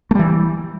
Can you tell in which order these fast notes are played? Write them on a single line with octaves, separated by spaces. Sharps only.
A3 G3 E3